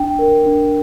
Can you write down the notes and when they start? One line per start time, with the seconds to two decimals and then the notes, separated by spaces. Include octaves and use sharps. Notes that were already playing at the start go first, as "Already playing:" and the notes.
Already playing: D4 G5
0.19 A#4
0.46 D4